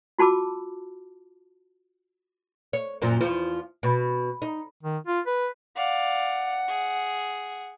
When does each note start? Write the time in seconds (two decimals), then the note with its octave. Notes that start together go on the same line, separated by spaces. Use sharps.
0.19 F4 F#4 A5 B5 D6 E6
2.73 C#5
3.02 F#2 A#2 F3
3.21 E2 F3
3.83 B2
4.42 D#4
4.83 D#3
5.07 F4
5.27 B4
5.76 D5 F5 F#5
6.68 G#4